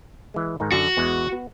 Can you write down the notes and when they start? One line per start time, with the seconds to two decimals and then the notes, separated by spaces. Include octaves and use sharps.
0.34 E3 G#3
0.60 G#2 D#3 D#4
0.72 F#2 D3 F#4
0.97 E2 G#3 B3
1.32 B3